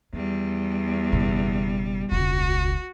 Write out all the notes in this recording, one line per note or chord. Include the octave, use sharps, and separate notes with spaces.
E2 D#3 G3
F#1 B2
E1 C#2 F#4